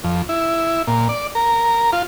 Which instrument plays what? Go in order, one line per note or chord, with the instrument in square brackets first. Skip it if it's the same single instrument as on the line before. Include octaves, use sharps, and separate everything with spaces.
[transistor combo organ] F2
E4
A#2
D5
A#4
F4